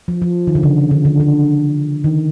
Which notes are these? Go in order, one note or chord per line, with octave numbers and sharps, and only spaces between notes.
F3
F3
D#3
D3
C#3
D3
D3
D3
D#3